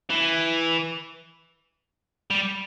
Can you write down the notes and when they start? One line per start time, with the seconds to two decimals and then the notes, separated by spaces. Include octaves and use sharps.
0.10 E3
2.30 G3